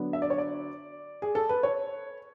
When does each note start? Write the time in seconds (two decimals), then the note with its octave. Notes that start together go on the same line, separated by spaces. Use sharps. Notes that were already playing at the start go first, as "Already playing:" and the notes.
Already playing: D3 F#3 B3 D4
0.13 E5
0.22 D5
0.30 C#5
0.38 D5
1.22 G#4
1.35 A4
1.49 B4
1.63 C#5